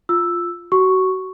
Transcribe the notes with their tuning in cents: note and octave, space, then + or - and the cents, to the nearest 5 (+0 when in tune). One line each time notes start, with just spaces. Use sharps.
F4 +0 E6 +0
F#4 +25 C#6 +0